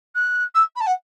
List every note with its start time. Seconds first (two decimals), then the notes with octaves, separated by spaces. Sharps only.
0.15 F#6
0.55 E6
0.76 B5
0.80 A5
0.86 F#5